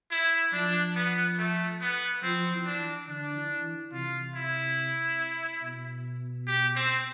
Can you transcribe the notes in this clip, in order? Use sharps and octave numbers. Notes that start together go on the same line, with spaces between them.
E4
F3 D4
B3
A3
B3
F3 C4
E3
D4
D3 D4
E3
E3
C3 F4
E4
B2
G4
C4